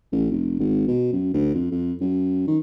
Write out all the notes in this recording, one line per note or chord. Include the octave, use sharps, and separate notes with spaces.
A1
F1
G#1
B2
F#2
D2
F2
F2
F#2
D#3